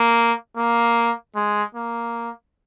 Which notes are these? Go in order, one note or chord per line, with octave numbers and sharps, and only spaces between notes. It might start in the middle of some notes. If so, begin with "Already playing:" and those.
Already playing: A#3
A#3
G#3
A#3